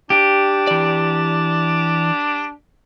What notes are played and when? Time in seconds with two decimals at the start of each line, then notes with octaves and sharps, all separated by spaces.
0.10 D4 G4
0.67 E3 D5